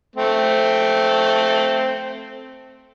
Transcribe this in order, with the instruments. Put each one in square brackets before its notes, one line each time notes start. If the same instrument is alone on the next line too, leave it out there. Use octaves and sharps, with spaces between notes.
[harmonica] A3 C4